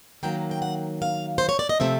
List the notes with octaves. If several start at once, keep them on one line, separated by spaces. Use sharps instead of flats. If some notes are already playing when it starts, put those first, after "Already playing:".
D#3 F#3 A#3 G5
G5
F#5
F5
C5
C#5
D5
D#5
C3 F3 A3 C4 E5